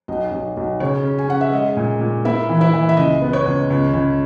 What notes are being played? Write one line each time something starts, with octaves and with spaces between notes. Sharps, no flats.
B1 D#5
B1
B1
C#3 C#5
C#4
G#5
C#4 F#5
E5
G#3 D#5
A#2
A#2
A#3 E4 E5
E3
E4 E5
E3
E5
C#2 D#5
B3
C#5
C#2
C#2
C#2